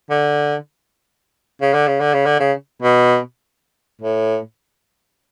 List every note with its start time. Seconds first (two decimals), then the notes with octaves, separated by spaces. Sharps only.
0.10 D3
1.61 C#3
1.74 D3
1.87 C#3
2.00 D3
2.14 C#3
2.26 D3
2.40 C#3
2.82 B2
4.02 A2